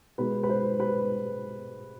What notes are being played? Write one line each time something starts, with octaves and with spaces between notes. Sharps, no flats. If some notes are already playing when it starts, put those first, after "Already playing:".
B2 G#3 B4
B4
C5
B4